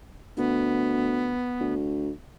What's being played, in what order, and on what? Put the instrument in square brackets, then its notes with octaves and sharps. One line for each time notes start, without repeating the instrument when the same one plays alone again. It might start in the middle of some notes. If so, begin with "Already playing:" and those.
[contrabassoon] D2 [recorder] B3
[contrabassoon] D2